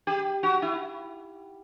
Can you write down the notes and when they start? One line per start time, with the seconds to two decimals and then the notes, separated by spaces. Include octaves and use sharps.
0.07 G4
0.43 F#4
0.62 E4